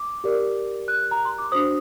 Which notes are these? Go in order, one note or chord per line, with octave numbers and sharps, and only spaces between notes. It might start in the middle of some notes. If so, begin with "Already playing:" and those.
Already playing: D6
G4 A#4 D5
F#6
A#5
C6
D6
D4 F#4 C5 D#6